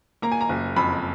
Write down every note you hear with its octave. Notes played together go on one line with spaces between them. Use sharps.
A#3 A#5
G#5
A#5
F#1
F2 B5